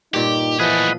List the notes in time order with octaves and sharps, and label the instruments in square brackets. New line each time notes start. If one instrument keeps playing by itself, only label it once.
[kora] G2 A#2 [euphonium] D#4 [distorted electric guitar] G4
[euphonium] E3 [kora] F3 [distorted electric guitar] A3 G#4 [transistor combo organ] D#5 F#5 B5